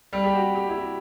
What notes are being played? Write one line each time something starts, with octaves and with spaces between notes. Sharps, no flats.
G3
G4
F#4
G4
E4
F#4